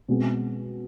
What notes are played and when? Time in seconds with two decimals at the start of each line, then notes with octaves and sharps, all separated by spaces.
0.09 B2 G#3 C4